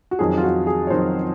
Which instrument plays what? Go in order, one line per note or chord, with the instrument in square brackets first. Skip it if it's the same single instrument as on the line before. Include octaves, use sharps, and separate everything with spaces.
[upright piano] F#4
F2 D#3 F#3 G#4
F4
F#4
G#4
C#5
F2 D#3 F#3 C5